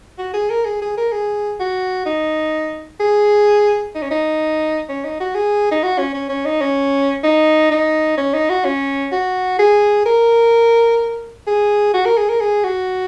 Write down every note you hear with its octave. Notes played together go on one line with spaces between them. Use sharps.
F#4
G#4
A#4
G#4
G#4
A#4
G#4
F#4
D#4
G#4
D#4
C#4
D#4
C#4
D#4
F#4
G#4
D#4
F#4
C#4
C#4
C#4
D#4
C#4
D#4
D#4
C#4
D#4
F#4
C#4
F#4
G#4
A#4
G#4
F#4
A#4
G#4
A#4
G#4
F#4